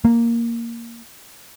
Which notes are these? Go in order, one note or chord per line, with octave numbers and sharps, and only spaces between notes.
A#3